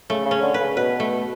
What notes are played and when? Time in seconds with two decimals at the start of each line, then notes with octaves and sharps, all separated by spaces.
0.10 C#3 A3
0.25 C#3
0.31 C#4
0.42 D3
0.54 B4
0.60 C#3
0.77 B2 B4
1.00 A3